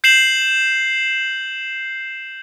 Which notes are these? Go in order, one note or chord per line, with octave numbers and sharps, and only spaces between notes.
G6 C7 E7 F#7